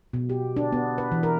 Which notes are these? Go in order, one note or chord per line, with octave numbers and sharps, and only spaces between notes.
B2
G4
D4
B3
B4
E3
A#4